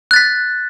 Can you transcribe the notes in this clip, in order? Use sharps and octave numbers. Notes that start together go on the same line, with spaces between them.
F#6 A6 B6